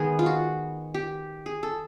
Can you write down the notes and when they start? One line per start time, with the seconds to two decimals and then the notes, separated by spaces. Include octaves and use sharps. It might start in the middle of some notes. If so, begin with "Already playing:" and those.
Already playing: D#3 G#3 B3 G#4
0.19 F4
0.26 F#4
0.94 G4
1.46 G#4
1.63 A4